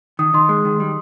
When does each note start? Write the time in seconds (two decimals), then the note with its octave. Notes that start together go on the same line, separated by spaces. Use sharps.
0.19 D#3 D#6
0.34 D#3 C6
0.49 G#3
0.65 D#3
0.80 G3